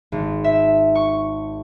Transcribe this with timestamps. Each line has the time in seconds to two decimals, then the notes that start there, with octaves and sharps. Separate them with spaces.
0.12 G#1
0.44 E5
0.95 C#6